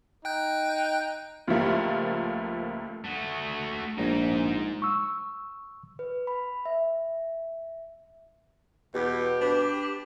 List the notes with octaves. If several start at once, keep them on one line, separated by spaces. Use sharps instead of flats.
D#4 G5 F#6 G6
C#2 F3 G3 A3 A#3
A3 F#4
A#1 G#2 D#4
C#6 E6
B4
B5
E5
E2 B2 G4
D4 B4